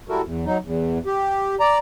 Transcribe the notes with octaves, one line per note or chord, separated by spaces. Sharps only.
G3 E4 F#4 A4 A#4
E2
F#3 D#4
E2
G4
D5 A#5